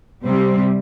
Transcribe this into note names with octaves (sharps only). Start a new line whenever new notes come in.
C3 G3 C4